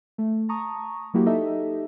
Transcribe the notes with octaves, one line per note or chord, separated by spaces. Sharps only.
A3
A5 A#5 C#6 D#6
F#3 A#3 E4 F#4 G4
D#4 G4 A4 D#5 E5